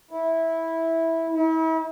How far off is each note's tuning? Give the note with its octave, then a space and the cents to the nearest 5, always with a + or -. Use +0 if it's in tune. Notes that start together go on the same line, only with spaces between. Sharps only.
E4 -10
E4 -40